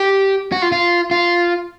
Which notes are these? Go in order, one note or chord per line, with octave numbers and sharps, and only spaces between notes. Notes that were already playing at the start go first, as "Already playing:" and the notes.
Already playing: G4
F#4
F4
F4
F4